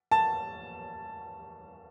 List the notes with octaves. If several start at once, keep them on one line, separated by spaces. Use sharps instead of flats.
A5